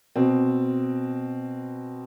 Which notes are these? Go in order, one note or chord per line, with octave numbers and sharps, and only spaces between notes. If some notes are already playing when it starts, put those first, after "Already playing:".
B2 C4